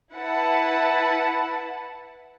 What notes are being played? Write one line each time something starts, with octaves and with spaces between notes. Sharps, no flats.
E4 B4 F#5 A5